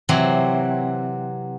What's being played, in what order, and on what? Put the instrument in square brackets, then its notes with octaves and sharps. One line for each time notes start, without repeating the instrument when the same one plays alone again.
[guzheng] C3 E3 F#3 C4